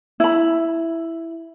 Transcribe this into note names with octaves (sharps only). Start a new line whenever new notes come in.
E4 B5